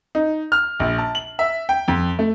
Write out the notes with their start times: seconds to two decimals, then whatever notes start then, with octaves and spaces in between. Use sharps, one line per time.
0.15 D#4
0.52 F6
0.80 A#1
0.98 A5
1.15 F#7
1.39 E5
1.69 G5
1.88 F2
2.19 A3